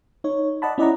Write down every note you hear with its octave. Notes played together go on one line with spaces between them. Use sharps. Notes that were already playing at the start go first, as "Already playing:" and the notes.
D#4 C#5
D5 D#5 F#5 A5 B5
C#4 E4 D5 D#5 F#5 A#5